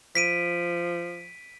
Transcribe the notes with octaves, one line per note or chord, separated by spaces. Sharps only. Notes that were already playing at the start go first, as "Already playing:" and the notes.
F3 B6 D7 D#7